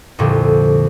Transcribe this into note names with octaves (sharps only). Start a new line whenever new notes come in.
C2 F2 A#2 D3